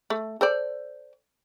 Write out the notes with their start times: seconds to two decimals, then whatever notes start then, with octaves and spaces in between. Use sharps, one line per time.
0.10 A3
0.41 A4 C5 D5